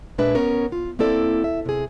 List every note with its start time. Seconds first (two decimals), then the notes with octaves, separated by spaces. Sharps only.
0.18 A#2 G#3 D4 B4 E5
0.35 B3 C#4 A#4 C#5
0.72 F4
0.99 A#3 C4 E4 A4 D5
1.44 E5
1.65 C3 G#4